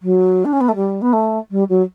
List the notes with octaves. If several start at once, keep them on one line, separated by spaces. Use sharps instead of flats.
F#3
D4
C#4
B3
A3
G3
B3
A3
G3
F#3